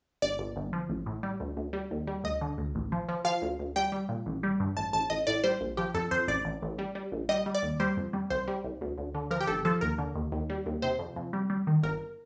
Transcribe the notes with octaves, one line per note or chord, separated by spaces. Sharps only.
G1 D5
G1
G1
F3
A1
A2
G3
D2
D2
G3
D#2
G3
D2 D#5
D3
D2
A1
F3
F3
F3 F5
D2
D2
G3 G5
G3
A#2
A1
G3
G2
A1 A5
A1 A5
A1 D#5
A2 D5
G3 C5
A#1
F3 G4
F2 A4
F2 C5
A1 D5
A1
A1
G3
G3
A#1
G3 D#5
G3
D5
D#2
G3 C5
F2
G3
C2 C5
G3
C2
D2
D2
D3
F3 A#4
G4
G1 A4
F3 A4
D#2 A#4
D3
D#2
D#2
G3
D#2
C3 C5
F2
F2
G3
G3
D#3
G1 A#4